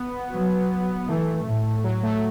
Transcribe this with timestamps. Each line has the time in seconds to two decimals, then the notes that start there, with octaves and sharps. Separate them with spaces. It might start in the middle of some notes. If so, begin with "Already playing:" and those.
Already playing: B3
0.31 F#3
1.07 E3 A3
1.45 A2
1.84 F#3
2.03 A3